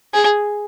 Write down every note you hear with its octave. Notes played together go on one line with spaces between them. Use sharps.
G#4